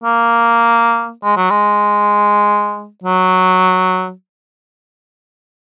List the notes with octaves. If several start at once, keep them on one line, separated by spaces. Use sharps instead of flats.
A#3
G#3
F#3
G#3
F#3